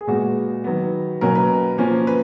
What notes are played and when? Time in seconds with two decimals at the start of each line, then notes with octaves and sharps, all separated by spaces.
0.01 G#4
0.07 A#2 G#3 B3 F#4
0.64 D#3 F#3 B3
1.21 B2 F#3 A#3 C#4 A#4
1.35 B4
1.78 F3 A#3 C#4
2.07 B4